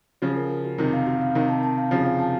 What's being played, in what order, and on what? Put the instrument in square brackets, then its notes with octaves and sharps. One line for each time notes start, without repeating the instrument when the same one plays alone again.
[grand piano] C#3 F3 [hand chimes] F#4
[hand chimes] A#4
A#4
F#4
[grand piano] C3 D#3 [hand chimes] A#4
[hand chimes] F5
F#4
F5
[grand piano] C3 D#3 [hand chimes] A#4
[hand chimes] A5
A5
F5
[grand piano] C#3 F3 [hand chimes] F#4
[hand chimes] F5
A5